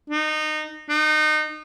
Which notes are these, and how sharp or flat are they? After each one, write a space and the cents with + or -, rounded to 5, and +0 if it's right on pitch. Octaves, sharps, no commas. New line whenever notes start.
D#4 -20
D#4 -30